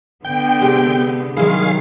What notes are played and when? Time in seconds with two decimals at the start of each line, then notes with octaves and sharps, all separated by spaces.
0.25 D3 B3 G5
0.61 C3 G#3 G4
1.37 D#3 F#3 G#3 E4 G#4 F5